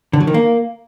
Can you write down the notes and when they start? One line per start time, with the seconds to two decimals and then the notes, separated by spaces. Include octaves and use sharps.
0.13 D3
0.20 F#3
0.27 D#3
0.34 A#3